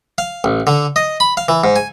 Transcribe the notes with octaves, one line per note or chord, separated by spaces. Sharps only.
F5
A1
D3
D#5
B5
F5
E3
G#2
G#5